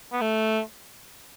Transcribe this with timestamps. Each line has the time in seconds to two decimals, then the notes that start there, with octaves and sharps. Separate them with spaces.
0.12 B3
0.21 A3